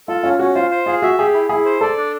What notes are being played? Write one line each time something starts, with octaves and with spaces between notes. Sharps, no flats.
F4 A4
C#4 F4
C#4 F#4
F4 C5
C5
F4 G#4
F#4 E5
G4 G#4
E4
E4 G#4
C5
A4 D5
D4